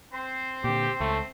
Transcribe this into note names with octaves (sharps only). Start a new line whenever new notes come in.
C4 C5
A#2 D3 G4
C#2 A3